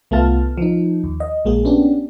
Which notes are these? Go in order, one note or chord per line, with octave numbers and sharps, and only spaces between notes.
C2 A3 B3 F4 A5 F6
F3 D#4
D#2
D#5
A#1 G#3 A#3 G#4
B3 C#4 D4 G4